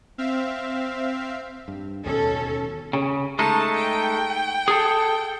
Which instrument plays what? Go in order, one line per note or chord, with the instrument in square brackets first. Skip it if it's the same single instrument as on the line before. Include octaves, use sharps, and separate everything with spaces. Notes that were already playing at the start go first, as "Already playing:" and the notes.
[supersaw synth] C4 E5 F5
[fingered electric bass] G2
[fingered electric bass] D1 D#2 B2 [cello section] C#4 A4
[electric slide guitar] C#3
[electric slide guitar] G#3 A3 D#4 [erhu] A5
[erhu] G5
[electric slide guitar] G#4 A4